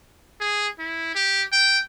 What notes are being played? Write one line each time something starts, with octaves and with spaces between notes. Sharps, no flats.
G#4
E4
G4
G5